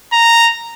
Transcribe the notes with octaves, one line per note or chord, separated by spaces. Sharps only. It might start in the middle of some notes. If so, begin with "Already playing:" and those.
A#5